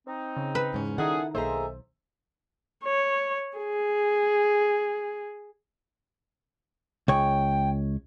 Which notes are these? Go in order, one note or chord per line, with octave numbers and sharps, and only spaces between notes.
C4 D#4
C#3
B4
E2 G#2 C#4
D#3 G3 C#4 D#4 E4 G#4 A4 F#5
B1 A#3 D#4 G#4 A4 C5 E5 A#5
C#5
G#4
C#2 C#5 G5